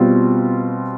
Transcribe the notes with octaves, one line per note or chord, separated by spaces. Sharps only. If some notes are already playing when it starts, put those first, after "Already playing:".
Already playing: B2 G3 C4 F4